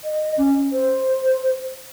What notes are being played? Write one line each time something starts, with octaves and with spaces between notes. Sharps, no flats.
D#5
C#4
C5